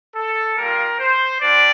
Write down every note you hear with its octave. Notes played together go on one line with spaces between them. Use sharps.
A4
G3 A#3 F4 A#4
C5
G3 D4 D5